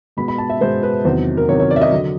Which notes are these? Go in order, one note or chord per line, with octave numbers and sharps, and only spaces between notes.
B2 G#3 B3 B5
B5
A5
E5
B2 G#3 B3 C5
B4
E2 C3 D#3 F#3 C5
A#4
E2 C3 D#3 F#3 C#5
C#5
D5
E5
D#5
D3 F#3